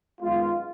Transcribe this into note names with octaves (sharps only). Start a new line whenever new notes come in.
F#2 D#3 G#3 B3 F4